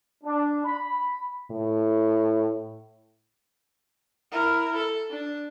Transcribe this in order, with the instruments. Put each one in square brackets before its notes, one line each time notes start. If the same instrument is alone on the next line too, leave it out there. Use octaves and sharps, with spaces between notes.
[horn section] D4
B5
[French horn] A2
[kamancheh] E4 A#4
A4
D4